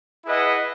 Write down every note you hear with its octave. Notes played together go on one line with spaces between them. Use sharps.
E4 G#4 B4 D#5 F#5